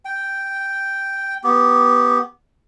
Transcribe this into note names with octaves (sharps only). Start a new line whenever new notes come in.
G5
B3 G4